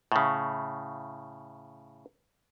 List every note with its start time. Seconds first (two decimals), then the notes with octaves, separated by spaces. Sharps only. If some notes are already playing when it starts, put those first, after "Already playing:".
0.12 A2 C#3